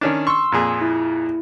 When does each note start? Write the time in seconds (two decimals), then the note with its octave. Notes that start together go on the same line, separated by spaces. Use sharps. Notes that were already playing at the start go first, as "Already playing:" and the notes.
0.01 D#3 C#4 D4
0.27 C6 C#6 E6
0.52 F2 A#2 G#4
0.81 E4